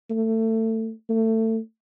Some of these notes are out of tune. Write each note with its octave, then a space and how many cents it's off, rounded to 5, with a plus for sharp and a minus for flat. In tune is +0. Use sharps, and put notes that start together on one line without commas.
A3 +25
A3 +25